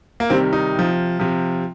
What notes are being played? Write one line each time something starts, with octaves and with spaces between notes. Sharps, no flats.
A#3
C3 D#3 G3 C4
D#4
C3 F3
C3 F3